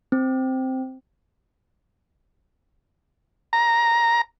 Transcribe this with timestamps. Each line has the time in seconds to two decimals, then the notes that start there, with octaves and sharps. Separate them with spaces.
0.12 C4
3.53 A#5